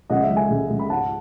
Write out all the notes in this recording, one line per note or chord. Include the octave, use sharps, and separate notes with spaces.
C#2 D#5 F#5
E5
G#3
E5 G#5
C#2
C#2
B5
G#2 F#5 A5